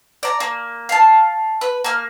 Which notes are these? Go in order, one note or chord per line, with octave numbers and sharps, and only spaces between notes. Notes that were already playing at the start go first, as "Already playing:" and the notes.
D5 A#5
A#3
F5 A5
B4
A#3 F6